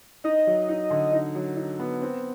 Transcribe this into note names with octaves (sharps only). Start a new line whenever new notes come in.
D#4 D#5
F#3
D#4
D3
D#4
F#3
D#4
B3
C4